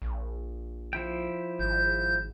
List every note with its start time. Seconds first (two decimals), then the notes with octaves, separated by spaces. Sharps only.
0.02 A#1
0.93 F3 E4 G5
1.59 G#1 G6